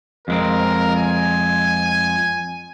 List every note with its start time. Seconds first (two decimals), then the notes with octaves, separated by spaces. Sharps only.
0.28 F2 G#3 C4 A#4
0.96 G#5